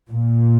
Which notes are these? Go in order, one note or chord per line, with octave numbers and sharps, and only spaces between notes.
A#2